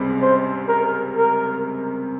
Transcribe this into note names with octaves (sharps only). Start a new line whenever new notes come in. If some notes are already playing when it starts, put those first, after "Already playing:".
Already playing: C#2 C3 G3 C4
C5
A#4
A#4